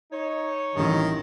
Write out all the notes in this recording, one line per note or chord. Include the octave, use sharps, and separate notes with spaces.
D#4 C#5
A1 G2 D#3